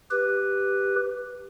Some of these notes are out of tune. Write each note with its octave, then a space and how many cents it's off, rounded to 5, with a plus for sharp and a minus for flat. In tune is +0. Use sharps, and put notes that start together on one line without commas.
G4 +0 B4 +0